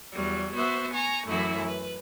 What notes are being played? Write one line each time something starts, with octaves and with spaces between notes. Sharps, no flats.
E2 F#3 G3
B3 F#4 C5 E5
G#5 A#5 C#6
F#2 A2 E3 E4 F#4
B4